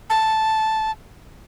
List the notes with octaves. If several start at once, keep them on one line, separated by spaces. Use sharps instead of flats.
A5